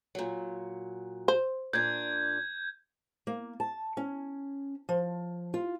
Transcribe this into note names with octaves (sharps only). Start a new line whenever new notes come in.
A#2 F#3
C5
A#2 D4 G6 G#6
A#3
A5
C#4
F3
F4